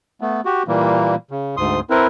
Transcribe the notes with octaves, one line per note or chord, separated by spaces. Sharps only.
A3 B3
F#4 G4
A#2 E3 G3 A#3
C#3
D2 G#2 C6 D#6
C4 E4 A#4 B4